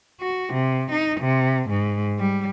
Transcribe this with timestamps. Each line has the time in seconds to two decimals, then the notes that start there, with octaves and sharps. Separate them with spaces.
0.21 F#4
0.53 C3
0.91 D#4
1.21 C3
1.69 G#2
2.19 G3